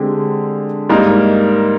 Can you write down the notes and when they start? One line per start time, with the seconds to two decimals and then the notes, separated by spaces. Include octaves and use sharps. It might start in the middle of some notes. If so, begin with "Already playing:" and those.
Already playing: D3 G#3 C4 G4
0.89 G#2 G3 A#3 D#4 A#4